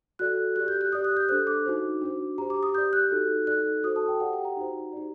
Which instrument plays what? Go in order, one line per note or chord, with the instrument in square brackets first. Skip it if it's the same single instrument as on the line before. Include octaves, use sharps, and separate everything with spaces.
[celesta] F#4 A4 D5 F#6
G4 D5 F#6
G6
F#6
G4 D5 D#6
F#6
G6
D4 A4 C5 F#6
D6
D#4 F#4 C5
D4 F#4 C5
G4 C5 A#5
D6
D#6
G4 D5 G6
F#6
D#4 F#4 A4
D#4 A4 D5 F#6
F#4 A4 C5 D#6
A5
G5
G4 D5 F#5
G5
A#5
D#4 F#4 C5
D#4 G4 D5